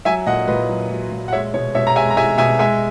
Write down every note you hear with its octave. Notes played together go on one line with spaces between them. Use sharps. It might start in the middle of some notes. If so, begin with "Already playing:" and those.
F#3 E5 G#5
A#2 D#5 F#5
A#2 B4 D#5
F#3
F#3
A#2
F#5
G#3 C#5 E5
B2 C#5
B2 C#5 E5
A#5
G#3 E5 G#5
A#5
G#3 E5 G#5
B2 E5 G#5
G#3 E5 G#5